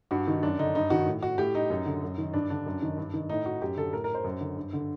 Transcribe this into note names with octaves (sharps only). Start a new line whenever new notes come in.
G2 F#4
D#3
F#2 D4
D3 D#4
G2 D#4
D#3 F#4
A2
F#4
A2 G4
D#4
F#2
D3
F#2
D#3
G2 D4
D3 D4
F#2
D#3
G2
D#3
A2 D#4
F#4
F#2 G4
D3 A4
A2 A#4
A#4
C5
F#2
D3
G2
D3